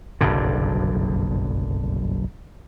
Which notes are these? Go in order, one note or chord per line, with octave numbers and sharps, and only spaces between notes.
F#1 B1 G2 D3